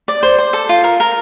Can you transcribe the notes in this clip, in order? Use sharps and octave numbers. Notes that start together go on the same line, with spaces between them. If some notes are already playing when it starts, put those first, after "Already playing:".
D5
C5
C5
A4
F4
A#4
A#4